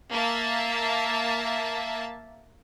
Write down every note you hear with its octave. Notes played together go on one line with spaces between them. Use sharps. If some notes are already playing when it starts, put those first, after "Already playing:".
A#3 E5 A5